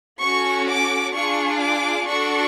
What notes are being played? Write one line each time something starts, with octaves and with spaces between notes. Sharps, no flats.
C#4 F#4 A4 C#6
D6
D4 F4 G#4 C#6
D6
D4 F#4 A4 C#6